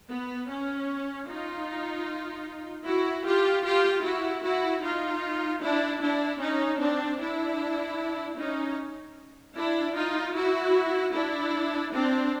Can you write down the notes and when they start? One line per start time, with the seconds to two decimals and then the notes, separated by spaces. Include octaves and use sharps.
0.09 B3
0.49 C#4
1.28 D#4 F4
2.85 E4 F#4
3.25 F4 G4
3.64 F4 G4
4.03 E4 F#4
4.42 E4 F#4
4.82 D#4 F4
5.61 D4 E4
6.01 D4 E4
6.40 C#4 D#4
6.79 C4 D4
7.19 D4 E4
8.37 C#4 D#4
9.55 D4 E4
9.95 D#4 F4
10.34 E4 F#4
11.13 D4 E4
11.92 C4 D4